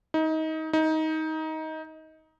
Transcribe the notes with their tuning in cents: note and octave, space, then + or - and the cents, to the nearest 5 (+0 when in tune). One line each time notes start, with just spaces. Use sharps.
D#4 +25
D#4 +20